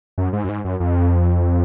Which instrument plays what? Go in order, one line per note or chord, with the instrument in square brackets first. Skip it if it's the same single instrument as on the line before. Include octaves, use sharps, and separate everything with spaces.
[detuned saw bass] F#2
G#2
F#2
G#2
F#2
F2